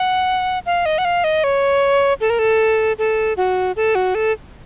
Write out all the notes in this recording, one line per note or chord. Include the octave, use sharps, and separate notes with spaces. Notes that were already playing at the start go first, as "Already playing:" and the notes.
Already playing: F#5
F5
D#5
F#5
F5
D#5
C#5
A4
A#4
A4
A4
F#4
A4
F#4
A4